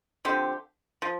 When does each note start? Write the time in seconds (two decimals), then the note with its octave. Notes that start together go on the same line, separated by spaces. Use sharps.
0.25 D3 F3 C4 G4
1.02 F3